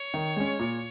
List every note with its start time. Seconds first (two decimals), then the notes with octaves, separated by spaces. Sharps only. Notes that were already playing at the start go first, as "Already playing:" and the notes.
Already playing: C#5
0.14 D#3
0.36 G#3 C#4
0.59 A#2